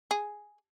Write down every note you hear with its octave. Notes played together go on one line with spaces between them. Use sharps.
G#4